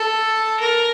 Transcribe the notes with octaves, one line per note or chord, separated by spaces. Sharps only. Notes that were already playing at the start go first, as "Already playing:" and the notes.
Already playing: A4
A#4